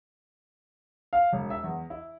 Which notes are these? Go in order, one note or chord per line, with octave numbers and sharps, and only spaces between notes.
F5
E1
E5
E2
E4